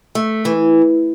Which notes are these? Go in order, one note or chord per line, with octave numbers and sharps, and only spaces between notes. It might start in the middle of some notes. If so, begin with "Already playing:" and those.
A3
E3